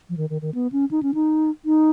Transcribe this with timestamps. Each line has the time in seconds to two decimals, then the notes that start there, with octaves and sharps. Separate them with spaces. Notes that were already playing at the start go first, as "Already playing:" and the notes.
0.09 F3
0.17 D#3
0.30 D#3
0.42 D#3
0.54 B3
0.72 C#4
0.91 D#4
1.03 C#4
1.14 D#4
1.65 D#4